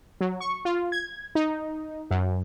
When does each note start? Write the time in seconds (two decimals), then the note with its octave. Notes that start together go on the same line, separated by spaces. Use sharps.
0.21 F#3
0.40 C#6
0.65 F4
0.92 G#6
1.35 D#4
2.11 F#2